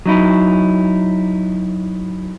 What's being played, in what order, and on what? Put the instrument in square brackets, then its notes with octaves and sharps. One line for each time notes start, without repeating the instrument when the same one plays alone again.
[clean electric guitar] F#3 D#4 E4